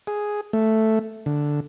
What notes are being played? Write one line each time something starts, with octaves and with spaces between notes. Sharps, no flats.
G#4
A3
D3